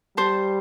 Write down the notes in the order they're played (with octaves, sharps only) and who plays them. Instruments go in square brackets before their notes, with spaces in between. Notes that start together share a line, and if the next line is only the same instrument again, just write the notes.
[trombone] G3 [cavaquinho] C5 A5 C6